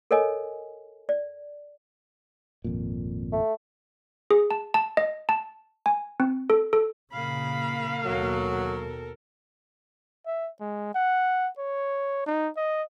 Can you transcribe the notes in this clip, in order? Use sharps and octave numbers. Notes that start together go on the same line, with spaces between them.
A4 A#4 C#5 D#5 G#5
D5
G#1 F2 A#2
A3
G#4
A5
A5
D#5
A5
G#5
C4
A4
A4
A#2 C#3 A#3 F5 B5
D#2 B2 F#3 A4 A#4
E5
G#3
F#5
C#5
D#4
D#5